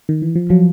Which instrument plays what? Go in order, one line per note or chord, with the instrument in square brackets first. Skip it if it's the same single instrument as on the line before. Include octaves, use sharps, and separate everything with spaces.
[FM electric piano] D#3
E3
F3
[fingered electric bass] F3 [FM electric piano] F#3